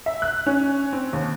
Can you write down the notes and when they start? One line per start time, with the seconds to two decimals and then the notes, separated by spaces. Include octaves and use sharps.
0.06 E5
0.22 F#6
0.46 C#4
0.93 C4
1.13 D#2